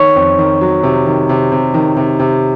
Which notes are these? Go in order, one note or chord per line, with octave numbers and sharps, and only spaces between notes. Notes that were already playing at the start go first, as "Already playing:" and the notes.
Already playing: D#3 C#5 C#6
F2
D#3
F#3
C3
D#3
C3
C3
D#3
C3
C3